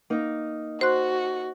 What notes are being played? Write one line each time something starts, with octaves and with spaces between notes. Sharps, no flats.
A#3 D#4
F#4 C5 C6 F#6